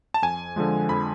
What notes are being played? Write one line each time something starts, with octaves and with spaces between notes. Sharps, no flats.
A5
F2 G#5
D3 F3 G#3
F2 B5